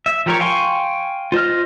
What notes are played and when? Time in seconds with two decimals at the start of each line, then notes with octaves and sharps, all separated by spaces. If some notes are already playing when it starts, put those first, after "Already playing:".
0.06 E5
0.26 F3 G4 A#4 C#5 C#6
0.40 F5 G5 G#5 C6 C#6
1.32 F4 C5 D#5 F6